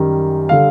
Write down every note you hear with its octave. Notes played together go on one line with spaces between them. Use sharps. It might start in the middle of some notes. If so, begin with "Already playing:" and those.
Already playing: F#2 D#3 G3
D3 G3 F5